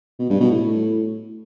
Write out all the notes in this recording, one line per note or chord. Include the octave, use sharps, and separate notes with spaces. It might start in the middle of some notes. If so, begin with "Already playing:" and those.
B2
G2
B2
A2